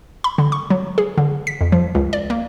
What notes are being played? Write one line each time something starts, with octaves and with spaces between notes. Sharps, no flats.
B5
D3
C#6
F#3
G#4
D3
B6
F2
F3
C#2
D5
A#3